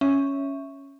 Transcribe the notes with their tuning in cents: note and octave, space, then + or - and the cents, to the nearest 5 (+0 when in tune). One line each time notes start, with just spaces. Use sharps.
C#4 +0 E5 +0